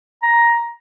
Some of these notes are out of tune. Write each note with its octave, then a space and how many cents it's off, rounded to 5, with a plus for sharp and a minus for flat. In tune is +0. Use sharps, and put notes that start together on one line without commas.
A#5 +10